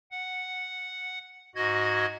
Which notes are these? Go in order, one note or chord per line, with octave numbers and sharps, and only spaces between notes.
F#5
G#2 F#4 D#5 G#6